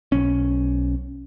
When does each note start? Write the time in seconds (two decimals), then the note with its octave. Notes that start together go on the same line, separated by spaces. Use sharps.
0.12 B1 C#4